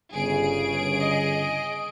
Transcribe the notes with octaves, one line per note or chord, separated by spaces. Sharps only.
G1 C#3 G#4 D7
D#5